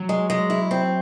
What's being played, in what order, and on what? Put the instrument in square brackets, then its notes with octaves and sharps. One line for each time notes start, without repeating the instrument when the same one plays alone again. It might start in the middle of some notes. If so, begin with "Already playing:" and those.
Already playing: [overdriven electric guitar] F#3
[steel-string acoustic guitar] G#3
G#3
E4
C4